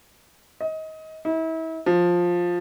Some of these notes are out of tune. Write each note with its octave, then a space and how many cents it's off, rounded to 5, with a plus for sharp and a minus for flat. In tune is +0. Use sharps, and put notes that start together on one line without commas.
D#5 +25
E4 -35
F3 +10